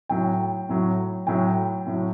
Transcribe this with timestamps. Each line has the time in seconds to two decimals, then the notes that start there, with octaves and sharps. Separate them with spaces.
0.09 A2 F#3 G5
0.69 A2 F#3
1.27 A2 F#3 G5
1.87 A2 F#3